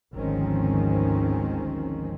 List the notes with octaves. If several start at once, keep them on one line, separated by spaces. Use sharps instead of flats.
G#1 D2 D#3 F3 C4 C#4